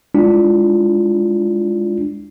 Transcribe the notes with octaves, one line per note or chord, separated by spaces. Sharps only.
G#3 D4 E4 F4